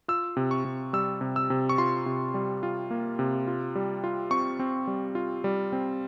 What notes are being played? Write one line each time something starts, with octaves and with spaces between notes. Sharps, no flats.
F4 E6
C3
C#6
C3
G3 E6
C3
E6
C3
C#6
F4 C6
C3
G3
F4
A#3
C3
F4
G3
F4
C4 C#6
C4
G3
F4
G3
C4